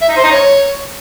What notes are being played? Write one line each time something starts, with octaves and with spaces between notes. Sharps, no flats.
E5
D#4
C5
D#4
C#5